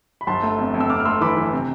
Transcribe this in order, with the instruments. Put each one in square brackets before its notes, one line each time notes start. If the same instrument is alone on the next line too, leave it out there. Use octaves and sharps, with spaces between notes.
[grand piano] B5
G1 A5 C6
A3
F2
F2
E6
F2 D6 F6
F6
A3 C6 E6
E3 B5 D6
E3
C3